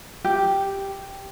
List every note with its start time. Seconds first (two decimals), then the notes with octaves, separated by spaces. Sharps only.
0.24 G4